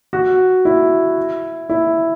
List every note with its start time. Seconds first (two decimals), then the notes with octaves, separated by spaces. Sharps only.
0.13 F#4
0.65 E4
1.69 E4